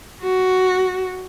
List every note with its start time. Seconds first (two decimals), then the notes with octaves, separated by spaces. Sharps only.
0.23 F#4